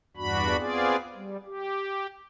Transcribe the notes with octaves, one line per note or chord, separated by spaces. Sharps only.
E2 G2 D4 F#4 B5
B3 C4 F4 G#4 D5
G3
G4